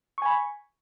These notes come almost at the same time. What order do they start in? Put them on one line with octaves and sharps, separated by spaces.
C#6 G#5 B5